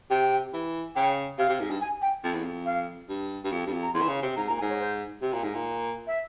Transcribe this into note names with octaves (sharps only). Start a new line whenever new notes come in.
C3 G5
E3
C#3 G5
C3 F5
C3
G#2
G2
G#5
G5
F2
E2
F2
F5
G2
G2
F2
G2
F2
A#5
E2 C6
E3
C#3
C3
G#2 A#5
A#2 A#5
G#5
G#2
C#5
C5
C3
A#2
G#2
A#2
E5